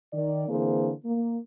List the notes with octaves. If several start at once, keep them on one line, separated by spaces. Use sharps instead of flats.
D#3 D5
D3 E3 A#3 C4 G#4 C5
A#3